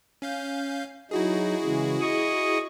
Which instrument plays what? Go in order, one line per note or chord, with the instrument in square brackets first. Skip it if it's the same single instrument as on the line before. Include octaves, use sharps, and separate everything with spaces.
[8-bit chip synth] C#4 F5 G6
[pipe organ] F#3 D#4 [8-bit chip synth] E4 F#4 G#4
[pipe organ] C#3 E3 G#3
D#5 C#6 D#6